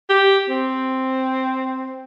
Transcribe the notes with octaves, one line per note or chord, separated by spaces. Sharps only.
G4
C4